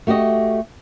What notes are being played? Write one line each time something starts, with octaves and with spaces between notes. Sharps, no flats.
A3 F#4 G4 D#5